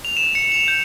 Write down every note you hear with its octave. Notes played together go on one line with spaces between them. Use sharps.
F7
E7
C#7
F7
G6